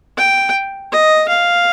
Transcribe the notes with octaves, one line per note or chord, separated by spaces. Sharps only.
G5
D#5
F5